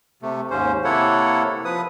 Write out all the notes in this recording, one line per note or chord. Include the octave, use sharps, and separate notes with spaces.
C3 A3
D#2 G#2 C#4 C5
C3 A#3 E4 A4 C#5 F#5
F3 B4 D#6